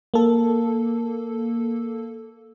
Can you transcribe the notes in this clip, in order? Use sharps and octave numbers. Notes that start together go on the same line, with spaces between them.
A#3 A4